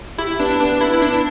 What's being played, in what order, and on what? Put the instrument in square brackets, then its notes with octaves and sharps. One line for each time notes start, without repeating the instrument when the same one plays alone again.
[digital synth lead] E4 [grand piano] G4
[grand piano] B3 [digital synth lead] D4
[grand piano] B3 [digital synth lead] D4
[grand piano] B3 [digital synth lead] E4
[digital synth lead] E4
[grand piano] B3 [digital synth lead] D4